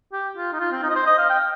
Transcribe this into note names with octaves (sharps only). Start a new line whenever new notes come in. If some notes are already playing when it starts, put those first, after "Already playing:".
G4
F4
D#4
F4
C4
D#4
D#5
C5
D#5
F5
G5